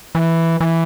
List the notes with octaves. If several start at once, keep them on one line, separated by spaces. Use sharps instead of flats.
E3
E3